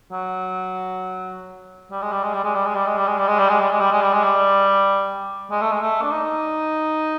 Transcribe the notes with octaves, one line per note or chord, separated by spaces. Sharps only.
F#3
G3
G#3
G3
G#3
G3
G#3
G3
G#3
G3
G#3
G3
G#3
G3
G#3
G3
G#3
G3
G#3
G3
G#3
G3
G#3
G3
G#3
A3
G#3
A3
D4
D#4